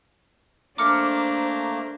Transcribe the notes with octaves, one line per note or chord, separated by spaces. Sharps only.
A3 A#3 D4 C5 A#5 D6 F6 C#7